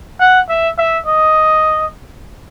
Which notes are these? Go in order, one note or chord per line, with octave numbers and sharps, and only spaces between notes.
F#5
E5
E5
D#5